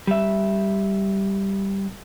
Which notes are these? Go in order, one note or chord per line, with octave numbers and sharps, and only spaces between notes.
G3 E5